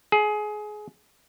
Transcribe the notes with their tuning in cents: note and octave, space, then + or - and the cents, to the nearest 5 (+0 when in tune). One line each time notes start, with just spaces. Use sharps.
G#4 +20